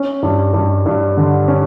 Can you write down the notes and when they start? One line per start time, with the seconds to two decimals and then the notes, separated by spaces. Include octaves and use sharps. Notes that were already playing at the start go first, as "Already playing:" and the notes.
Already playing: C#4
0.23 G2
0.54 G2
0.86 G2
1.17 D3
1.48 C#4